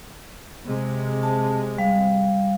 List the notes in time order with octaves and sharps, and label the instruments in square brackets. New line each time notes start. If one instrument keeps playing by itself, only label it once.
[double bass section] C3 G#3
[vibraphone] A5
G3 F5